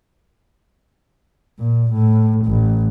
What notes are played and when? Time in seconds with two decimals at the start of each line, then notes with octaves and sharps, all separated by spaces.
1.59 A#2
1.92 A2
2.45 A1